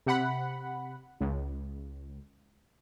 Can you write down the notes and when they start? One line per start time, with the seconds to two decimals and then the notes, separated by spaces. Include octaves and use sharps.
0.06 C3 F#5 B5
1.21 C#2